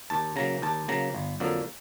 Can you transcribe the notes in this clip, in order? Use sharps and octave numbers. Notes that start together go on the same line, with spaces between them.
D#2 A5
C#3 F#3 A#3 A#5
D#2 A5
C#3 F#3 A#3 A#5
G1
F2 D3 F#3 A#3